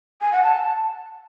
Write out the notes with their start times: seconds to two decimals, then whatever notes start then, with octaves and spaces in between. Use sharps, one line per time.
0.21 G#5
0.32 F#5
0.43 A5